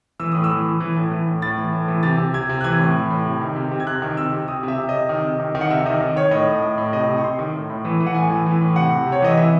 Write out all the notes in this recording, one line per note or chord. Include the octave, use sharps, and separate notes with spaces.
E3 E6
A2 D#6
E6
E3
E3
E3
A2
E3
A2
A2 A6
E3
A2
E3
C3 A6
C3
C3 G#6
C3
F#6
E3 G#6
A2
E3
A2
C3
D#3
C3
C3
G#6
C3 F#6
D#3
C3 E6
C3
C3 D#6
C3
E5
C3
C3 D#5
D#3
C3
D#3
D#3
F#5
C3 E5
D#3 D#5
D#3
D#3 C#5
A2 D#5
A2
A2
A2
C3 D#5
C3
C#6
C3 C6
D#3
A2
A2
E3
E3
F#5
A2 G#5
E3
E3
A2
C3 F#5
C3
C3
C#5
E3 D#5
E3 E5